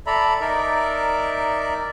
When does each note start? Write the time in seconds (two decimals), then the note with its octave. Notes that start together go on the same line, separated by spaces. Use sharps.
0.07 A4 D5 E5 A#5 B5
0.41 D#4 A#4 D5 E5